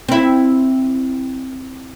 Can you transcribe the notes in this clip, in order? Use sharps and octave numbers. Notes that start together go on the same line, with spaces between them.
C4 E4